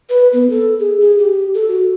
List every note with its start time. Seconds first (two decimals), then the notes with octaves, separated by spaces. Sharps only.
0.09 B4
0.33 B3
0.50 A4
0.79 G#4
1.00 G#4
1.18 G4
1.54 A4
1.69 F#4